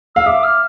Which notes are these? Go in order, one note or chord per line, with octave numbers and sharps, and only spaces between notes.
F5 E6
E5 D6
F6